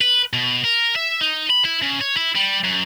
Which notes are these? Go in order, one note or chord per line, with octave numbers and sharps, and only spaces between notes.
B4
B2
A#4
E5
D#4
B5
E4
C#3
C#5
E4
G3
F#2